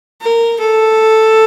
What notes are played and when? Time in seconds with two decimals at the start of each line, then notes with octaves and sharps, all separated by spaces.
0.22 A#4
0.61 A4